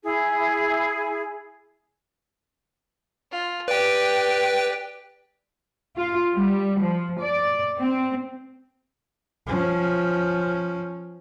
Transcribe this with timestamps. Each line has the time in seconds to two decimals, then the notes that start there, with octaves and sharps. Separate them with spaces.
0.03 E4 G#4
3.32 F4
3.68 G4 B4 D5 G5
5.96 F4
6.33 G3
6.79 F3
7.19 D5
7.78 C4
9.47 F3 C#4